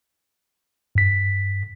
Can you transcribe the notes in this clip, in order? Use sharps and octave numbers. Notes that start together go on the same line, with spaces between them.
G2 B6